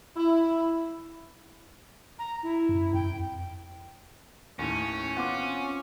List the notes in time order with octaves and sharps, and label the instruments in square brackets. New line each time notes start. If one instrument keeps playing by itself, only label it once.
[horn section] E4
[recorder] A#5
E4
[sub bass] F#2
[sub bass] F2 [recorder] G5
[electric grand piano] D#2 A2 [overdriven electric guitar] C#4
[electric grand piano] B3 C4 F4 [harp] F#5 C6 D6